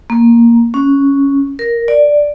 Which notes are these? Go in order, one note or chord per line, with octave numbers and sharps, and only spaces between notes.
A#3
C#4
A#4
D5